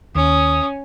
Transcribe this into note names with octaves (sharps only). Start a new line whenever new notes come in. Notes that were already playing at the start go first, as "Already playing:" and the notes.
D#2 C#4 D#6